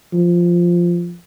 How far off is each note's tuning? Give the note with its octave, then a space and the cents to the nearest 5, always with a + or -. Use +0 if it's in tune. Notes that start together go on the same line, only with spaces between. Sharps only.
F3 -5